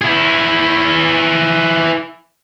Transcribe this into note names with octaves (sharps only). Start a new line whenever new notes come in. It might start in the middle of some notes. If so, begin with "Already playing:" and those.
E4 G#4